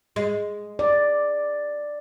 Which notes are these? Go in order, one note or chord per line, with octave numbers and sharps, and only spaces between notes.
G#3
D5